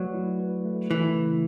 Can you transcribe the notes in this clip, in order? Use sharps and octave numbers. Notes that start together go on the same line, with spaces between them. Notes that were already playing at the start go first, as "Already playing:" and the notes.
Already playing: F#3 A3 B4 D5
E4
B4
A3
E3 A3
C#3